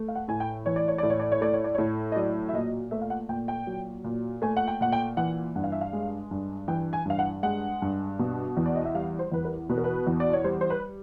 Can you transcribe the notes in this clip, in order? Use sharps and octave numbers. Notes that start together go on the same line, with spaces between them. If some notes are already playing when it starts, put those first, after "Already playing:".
Already playing: A3
F5
F#5
A2 G#5
G5
E3 C#5
D5
C#5
A2 D5
C#5
D5
C#5
A3 D5
C#5
D5
A2 C#5
D#5
F#3 D5
E5
A#2 D#5
A3 E5
F5
F#5
A#2 G5
G5
F#3
A#2
A3 G#5
F#5
G5
A#2 F#5
G5
E3 F#5
G2 F#5
F5
E5
F5
G#3
G2
E3 G5
G#5
G2 F5
F#5
G#3 F#5
G2
B2
E2
D5
D#5
E5
G3 F5
C5
E2 B4
A#4
B2 B4
A#4
B4
E2
D5
C#5
G3 C5
C5
B4